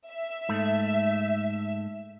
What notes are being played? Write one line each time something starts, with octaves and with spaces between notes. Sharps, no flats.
E5
G#2 A3